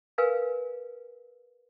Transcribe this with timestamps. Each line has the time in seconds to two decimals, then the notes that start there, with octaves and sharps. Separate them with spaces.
0.18 A#4 B4 F5 G#5